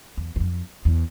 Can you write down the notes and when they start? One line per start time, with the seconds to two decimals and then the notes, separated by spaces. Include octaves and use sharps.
0.17 E2
0.36 E2
0.40 F2
0.85 E2